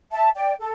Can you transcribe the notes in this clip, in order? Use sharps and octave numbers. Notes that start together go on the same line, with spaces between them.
E5 A5
D5 G5
A4